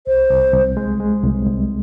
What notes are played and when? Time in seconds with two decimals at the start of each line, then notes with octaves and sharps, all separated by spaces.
0.07 C2 C5
0.31 C2
0.53 C2
0.77 G#3
1.00 G#3
1.23 C2
1.46 C2